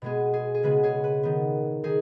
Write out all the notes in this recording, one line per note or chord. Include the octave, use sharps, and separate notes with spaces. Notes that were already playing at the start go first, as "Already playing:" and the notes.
B2 G#3 B3 G#4
G#4
G#4
C#3 G#3 B3 B4
G#4 C#5
B4
D#3 B3
D#3 G#4